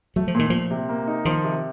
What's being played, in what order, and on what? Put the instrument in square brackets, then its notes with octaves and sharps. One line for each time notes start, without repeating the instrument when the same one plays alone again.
[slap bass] F#3 [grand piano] A3
[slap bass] F3
[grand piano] A#2 [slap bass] D#3
[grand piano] A#2 [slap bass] F3
[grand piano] C3
A#3
D#4
[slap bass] D#3 [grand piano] F3
[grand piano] C3